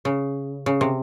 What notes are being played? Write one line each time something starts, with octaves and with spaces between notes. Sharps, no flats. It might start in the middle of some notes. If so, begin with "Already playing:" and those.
C#3
C#3
C3